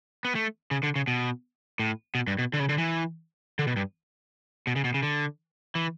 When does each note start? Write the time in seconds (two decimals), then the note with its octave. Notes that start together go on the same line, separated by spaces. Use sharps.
0.25 B3
0.35 A3
0.71 C#3
0.83 D3
0.96 C#3
1.07 B2
1.79 A2
2.15 B2
2.27 G2
2.38 B2
2.53 D3
2.60 C#3
2.69 D3
2.78 E3
3.59 D3
3.67 B2
3.76 G2
4.67 B2
4.76 C#3
4.84 B2
4.94 C#3
5.03 D3
5.75 E3